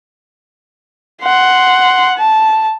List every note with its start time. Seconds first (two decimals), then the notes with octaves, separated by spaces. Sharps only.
1.23 F#5 C6
2.17 A5